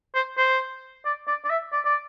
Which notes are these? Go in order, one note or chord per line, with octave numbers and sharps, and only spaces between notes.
C5
C5
D5
D5
D5
E5
D5
D5